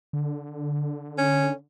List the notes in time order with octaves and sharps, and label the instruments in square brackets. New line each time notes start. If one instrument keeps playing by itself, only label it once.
[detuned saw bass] D3
[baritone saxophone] C#4